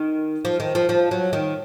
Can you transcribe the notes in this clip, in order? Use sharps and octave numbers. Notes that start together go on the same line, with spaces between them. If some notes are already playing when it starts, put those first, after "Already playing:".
Already playing: D#3
F3
D#3
F3
F3
F#3
D#3